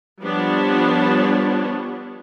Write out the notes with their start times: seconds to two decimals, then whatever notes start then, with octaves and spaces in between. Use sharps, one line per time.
0.22 F3 G3 B3 D4 C#5